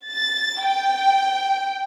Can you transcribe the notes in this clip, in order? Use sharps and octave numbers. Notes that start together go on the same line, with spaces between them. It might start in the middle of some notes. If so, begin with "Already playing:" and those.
A6
G5